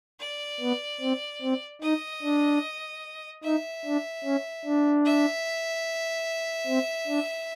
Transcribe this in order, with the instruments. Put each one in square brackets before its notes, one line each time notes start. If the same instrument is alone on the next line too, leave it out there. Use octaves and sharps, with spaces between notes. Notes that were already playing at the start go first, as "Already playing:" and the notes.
[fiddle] D5
[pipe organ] B3
C4
C4
[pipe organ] D#4 [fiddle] D#5
[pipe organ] D4
[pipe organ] D#4 [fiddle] E5
[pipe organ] D4
C#4
D4
[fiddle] E5
[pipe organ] C4
D4